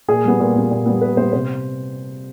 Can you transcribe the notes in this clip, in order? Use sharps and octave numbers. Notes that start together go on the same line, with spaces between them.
A#2 G#4
G3 B3
A#2
G3 B3
A#2
G3 B3
A#2 B4
G3 B3 C5
C3 C5